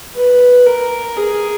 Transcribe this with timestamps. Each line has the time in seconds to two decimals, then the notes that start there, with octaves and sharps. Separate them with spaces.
0.15 B4
0.66 A#4
1.17 G#4